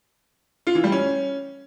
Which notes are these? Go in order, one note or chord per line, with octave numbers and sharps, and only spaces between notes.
F4
E3
G3
C#4